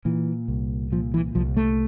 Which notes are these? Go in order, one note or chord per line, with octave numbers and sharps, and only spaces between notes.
A#2 E3
C2
A#2 F3
E3
C2 F3
A3